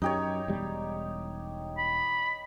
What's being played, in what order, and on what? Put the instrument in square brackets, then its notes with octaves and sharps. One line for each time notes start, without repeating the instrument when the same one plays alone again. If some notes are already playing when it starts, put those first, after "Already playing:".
[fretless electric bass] F#2 [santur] D#4 G4 C#5
[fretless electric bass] E1 G3
[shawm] B5